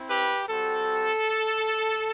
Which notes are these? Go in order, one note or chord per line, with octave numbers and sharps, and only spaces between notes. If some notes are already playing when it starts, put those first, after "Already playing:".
Already playing: C4 E4
G4 B4
G3 C4 F#4 A4